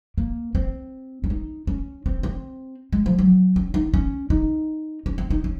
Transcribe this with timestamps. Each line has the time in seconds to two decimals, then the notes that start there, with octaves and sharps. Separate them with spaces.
0.18 A#3
0.55 C4
1.24 C#4
1.30 D#4
1.67 C#4
2.06 C4
2.23 C4
2.93 G#3
3.06 F3
3.19 F#3
3.56 C#4
3.74 D#4
3.94 C#4
4.30 D#4
5.06 C#4
5.18 C4
5.30 D#4
5.44 C#4